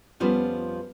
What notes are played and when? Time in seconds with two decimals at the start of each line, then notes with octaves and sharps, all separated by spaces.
0.20 F2 F3 G3 B3 C#4